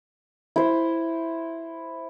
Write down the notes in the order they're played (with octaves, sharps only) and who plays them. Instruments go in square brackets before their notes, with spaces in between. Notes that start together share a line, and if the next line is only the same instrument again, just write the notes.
[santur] E4 C5